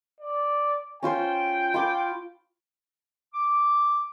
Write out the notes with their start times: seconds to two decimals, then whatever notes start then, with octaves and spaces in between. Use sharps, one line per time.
0.21 D5
1.03 C#4 F4 C5 G5
1.74 F4 B5 D6
3.34 D6